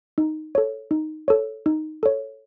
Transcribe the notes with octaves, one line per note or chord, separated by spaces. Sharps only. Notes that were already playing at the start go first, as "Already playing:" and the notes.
D#4
A4 C#5
D#4
A4 C#5
D#4
A4 C#5